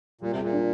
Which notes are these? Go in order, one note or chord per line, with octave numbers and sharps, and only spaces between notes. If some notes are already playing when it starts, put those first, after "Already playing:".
A#2 G3
C3
G#4
A#2
D4